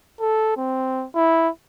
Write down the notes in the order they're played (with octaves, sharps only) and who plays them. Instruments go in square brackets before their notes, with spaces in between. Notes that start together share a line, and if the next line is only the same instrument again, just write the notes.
[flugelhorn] A4
C4
E4